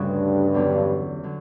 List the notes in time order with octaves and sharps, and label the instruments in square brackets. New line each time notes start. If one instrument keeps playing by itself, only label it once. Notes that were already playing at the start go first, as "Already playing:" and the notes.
Already playing: [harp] D2 C#3 G3 C#4 F#4 [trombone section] G2
[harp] E2 D3 F#3 C#4
D3 F#3